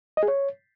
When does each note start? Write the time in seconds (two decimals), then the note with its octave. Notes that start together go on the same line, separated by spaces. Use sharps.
0.17 D#5
0.23 G#4
0.28 C#5